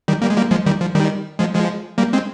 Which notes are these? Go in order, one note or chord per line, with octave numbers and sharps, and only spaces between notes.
D#3 G3
G3 A#3
G#3
G3 A#3
F3 G#3
D#3 G3
F3
D#3 G3
F3 G#3
F3 G#3
G3 A#3
G#3 C4